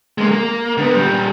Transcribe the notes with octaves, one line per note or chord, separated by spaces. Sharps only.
G#3 A#3
A#3
D3 B3
A#2 G3